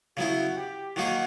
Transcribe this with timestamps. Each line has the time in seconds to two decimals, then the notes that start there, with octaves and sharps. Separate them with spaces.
0.17 C#3 F#3 B3 E4 F#4
0.56 G4
0.96 D#3 F#3 A#3 D#4 F#4 G#4